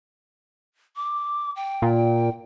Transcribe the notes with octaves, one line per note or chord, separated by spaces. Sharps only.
D6
G5
A#2